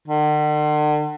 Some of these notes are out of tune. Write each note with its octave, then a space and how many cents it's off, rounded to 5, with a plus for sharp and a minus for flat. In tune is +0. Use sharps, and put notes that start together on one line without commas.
D3 +45